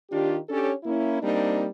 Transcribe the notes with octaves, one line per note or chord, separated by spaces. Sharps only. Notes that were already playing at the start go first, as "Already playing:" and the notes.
D#3 D4 F4 G4
C#4 D4 G4 A4 C#5
A#3 C#4 E4
G3 A#3 C4 D4 D#4